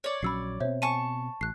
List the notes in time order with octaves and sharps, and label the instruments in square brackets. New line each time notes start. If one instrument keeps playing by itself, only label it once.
[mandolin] C#5 D5
[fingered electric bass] A#1 F#3 C#4 [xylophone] B5 E6 C7
[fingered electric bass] B2 C4 [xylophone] C5 C#5 E5
[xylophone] G#5 D#7 [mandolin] A5 C#6
[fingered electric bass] A1 [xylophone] F#6 C7